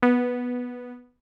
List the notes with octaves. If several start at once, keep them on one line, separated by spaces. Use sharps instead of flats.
B3